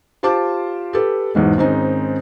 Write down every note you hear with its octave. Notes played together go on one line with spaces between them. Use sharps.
F4 G4 C5 A5 D6
G4 A4 B4
B1 E2 G#2 G#3
G#2 D#3 C4 C#4 D#4